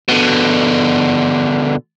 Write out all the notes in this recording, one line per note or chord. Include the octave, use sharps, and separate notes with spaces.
B2 D3